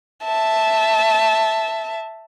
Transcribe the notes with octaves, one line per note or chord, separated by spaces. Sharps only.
E5 A5